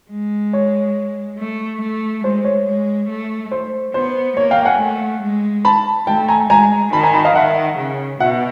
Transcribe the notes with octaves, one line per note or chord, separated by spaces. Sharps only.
G#3
C#5
A3
A3
G#3 C5
C#5
G#3
A3
C5
B3 C5
A#3 C#5
F5 G5
F#5 G#5
A3
G#3
A5 B5
A3 G5 A5
G#5 A#5
G#3 G#5 A#5
D#3 A5 B5
G#5 A#5
A5 B5
D#5 F5
D#3 E5 F#5
C#3
B2 E5 F#5